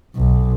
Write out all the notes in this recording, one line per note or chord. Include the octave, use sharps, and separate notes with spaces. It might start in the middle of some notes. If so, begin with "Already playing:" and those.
B1